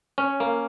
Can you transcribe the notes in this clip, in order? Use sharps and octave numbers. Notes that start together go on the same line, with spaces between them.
C#4
A#3